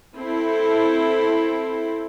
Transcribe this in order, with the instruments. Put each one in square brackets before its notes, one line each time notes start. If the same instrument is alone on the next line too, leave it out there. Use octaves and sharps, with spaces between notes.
[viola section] C4 E4 A4